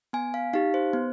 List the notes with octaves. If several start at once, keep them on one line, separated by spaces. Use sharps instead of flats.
B3 G#5
F5
D#4 G4 F5
C5
B3